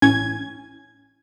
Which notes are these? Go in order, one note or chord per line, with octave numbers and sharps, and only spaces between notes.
A1 E3 C#4 G#5 G#6